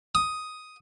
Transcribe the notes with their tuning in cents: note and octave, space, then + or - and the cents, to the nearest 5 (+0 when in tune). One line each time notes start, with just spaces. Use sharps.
D#6 +5